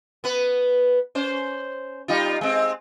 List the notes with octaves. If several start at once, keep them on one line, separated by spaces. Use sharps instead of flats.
B3 B4
C#4 C5
G3 D#4 F4
G#3 C4